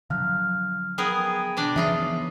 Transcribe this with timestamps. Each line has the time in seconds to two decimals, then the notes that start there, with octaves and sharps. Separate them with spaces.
0.10 D3 F3 F#3 F5 F6 F#6
0.98 B3 G#4 A#4 G5 G#6
1.57 B2 D4 D5
1.76 C#3 E3 F3 B3 D#4 F4 E5